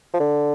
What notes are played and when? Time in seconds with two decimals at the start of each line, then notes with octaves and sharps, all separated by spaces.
0.14 F3
0.20 D3